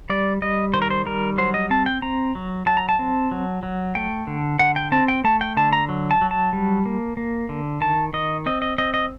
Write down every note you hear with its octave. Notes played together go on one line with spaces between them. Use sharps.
G3 D5
G3 D#5
D#3 C5
A#4
C5
G3 A#4
F#3 C5
D#5
C4 A5
G5
C4 A#5
F#3
F#3 A5
A#5
A5
C4
F#3
F#3
A3 G5
D3
D3 F#5
G5
C4 A5
G5
A3 A5
G5
D3 A5
A#5
F#3
A5
F#3
A5
G3
A#3
A#3
D3
D#3 A5
D#3 D#5
C4 D#5
D#5
C4 D#5
D#5